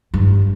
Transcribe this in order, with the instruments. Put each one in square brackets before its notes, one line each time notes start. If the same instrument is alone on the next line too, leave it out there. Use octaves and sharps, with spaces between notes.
[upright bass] G2